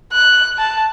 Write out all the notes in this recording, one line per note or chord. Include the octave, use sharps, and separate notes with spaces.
F#6
A5